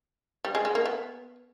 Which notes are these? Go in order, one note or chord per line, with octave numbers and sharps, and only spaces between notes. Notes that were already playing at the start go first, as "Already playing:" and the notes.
G3
G#3
G#3
A#3
B3